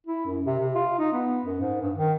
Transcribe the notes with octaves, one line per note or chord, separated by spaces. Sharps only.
E4
F#2
C3
C3
F4
D#4
B3
F#2
G#2
G2
D#3